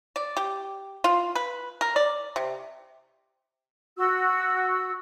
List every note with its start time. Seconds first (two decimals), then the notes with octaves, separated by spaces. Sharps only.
0.16 D5
0.37 G4
1.04 F4
1.35 B4
1.81 A#4
1.96 D5
2.36 C3
3.97 F#4 E6